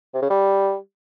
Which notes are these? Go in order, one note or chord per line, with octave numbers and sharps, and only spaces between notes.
C3
C#3
G3